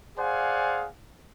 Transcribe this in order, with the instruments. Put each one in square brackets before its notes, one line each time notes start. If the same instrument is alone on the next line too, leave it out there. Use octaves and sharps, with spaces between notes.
[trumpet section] G#4 C5 D5 F5 F#5 G#5